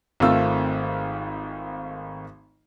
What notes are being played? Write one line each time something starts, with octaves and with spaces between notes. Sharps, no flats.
G#1 D#3 A3 C4 F4 E6